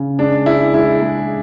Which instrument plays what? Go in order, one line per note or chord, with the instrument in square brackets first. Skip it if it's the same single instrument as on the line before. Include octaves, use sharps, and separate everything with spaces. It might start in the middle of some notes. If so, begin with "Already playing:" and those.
Already playing: [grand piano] C#3
G#3 D4
G#3 E4
G#3 E4
G#3